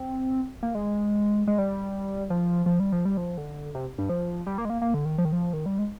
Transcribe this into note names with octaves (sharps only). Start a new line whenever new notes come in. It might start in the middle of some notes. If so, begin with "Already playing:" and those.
Already playing: C4
A#3
G#3
G#3
G3
F3
F3
G3
F3
G3
F3
D3
C3
G2
F3
G3
A#3
G#3
A#3
A#3
D3
D#3
F3
D#3
F3
D#3
G3
G#3